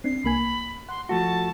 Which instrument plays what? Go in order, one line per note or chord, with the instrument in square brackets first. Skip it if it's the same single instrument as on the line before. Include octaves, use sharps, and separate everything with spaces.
[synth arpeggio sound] C4 D4 [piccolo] C7
[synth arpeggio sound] C2 A#3 G#5 [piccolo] B5
[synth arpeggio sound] F#5 [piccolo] C6
[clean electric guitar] F3 A3 F#4 [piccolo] A5